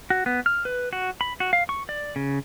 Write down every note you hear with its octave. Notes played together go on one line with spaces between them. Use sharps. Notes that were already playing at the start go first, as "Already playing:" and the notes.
F#4
B3
F6
B4
F#4
B5
F#4
F5
C#6
D5
C#3